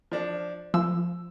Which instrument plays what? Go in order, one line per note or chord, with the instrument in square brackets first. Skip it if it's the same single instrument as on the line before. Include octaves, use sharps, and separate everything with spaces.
[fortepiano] F3 D4
[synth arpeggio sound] F3 [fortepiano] E6